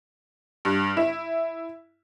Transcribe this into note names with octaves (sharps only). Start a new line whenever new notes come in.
G2
E4